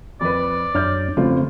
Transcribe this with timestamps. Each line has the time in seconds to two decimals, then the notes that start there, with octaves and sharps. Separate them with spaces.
0.21 F2 B4 D5
0.75 F#2 D4 C#5 F6 G6
1.17 F1 C#3 A3 C4 F4